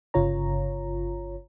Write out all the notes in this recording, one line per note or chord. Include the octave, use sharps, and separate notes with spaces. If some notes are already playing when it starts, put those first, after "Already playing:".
G1 C#3 F4 C#5 A#5